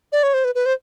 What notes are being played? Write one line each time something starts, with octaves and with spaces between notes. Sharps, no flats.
D5
C#5
C5
B4
B4
C5